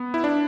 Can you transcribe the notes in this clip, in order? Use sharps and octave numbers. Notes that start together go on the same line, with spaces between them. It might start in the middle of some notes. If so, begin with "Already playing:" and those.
Already playing: B3
E4
D4